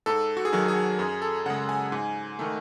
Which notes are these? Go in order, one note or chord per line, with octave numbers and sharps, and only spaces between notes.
G#2 A4
F#4
G#4
D#3 F#3 F#4
G#4
F#2 G#4
A4
C#3 G#3 F#5
G#5
G#2
D#3 A3